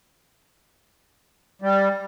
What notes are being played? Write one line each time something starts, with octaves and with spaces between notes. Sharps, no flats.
G3